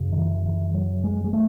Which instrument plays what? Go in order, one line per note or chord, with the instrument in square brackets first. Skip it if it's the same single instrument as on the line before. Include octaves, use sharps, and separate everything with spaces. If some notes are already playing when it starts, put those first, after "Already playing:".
Already playing: [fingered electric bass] F#2 C#3
D#3
E3
E3
F#3
G#3
G#3
A3